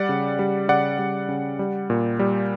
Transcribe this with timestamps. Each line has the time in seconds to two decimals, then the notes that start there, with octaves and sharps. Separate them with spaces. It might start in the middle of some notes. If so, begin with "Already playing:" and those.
Already playing: G3 D5 F#5
0.09 C#3
0.39 G3
0.68 C#3 D5 F#5
0.99 G3
1.29 C#3
1.59 G3
1.90 A#2
2.19 G3